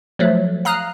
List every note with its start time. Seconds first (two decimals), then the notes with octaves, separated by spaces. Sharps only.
0.19 F3 F#3 A3
0.65 F5 A#5 D#6 F6 F#6